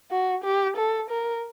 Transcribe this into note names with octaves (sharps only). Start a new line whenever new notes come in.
F#4
G4
A4
A#4